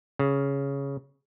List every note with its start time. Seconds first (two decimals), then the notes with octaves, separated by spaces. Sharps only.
0.19 C#3